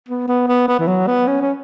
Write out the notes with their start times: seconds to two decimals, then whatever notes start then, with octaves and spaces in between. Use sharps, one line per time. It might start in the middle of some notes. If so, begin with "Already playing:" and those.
0.08 B3
0.28 B3
0.48 B3
0.68 B3
0.79 E3
0.87 F#3
1.07 B3
1.27 C#4
1.41 C#4